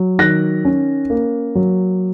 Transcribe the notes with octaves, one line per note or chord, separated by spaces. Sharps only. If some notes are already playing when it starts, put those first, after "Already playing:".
Already playing: F#3
D#3 F#6 A#6
C#4
A#3
F#3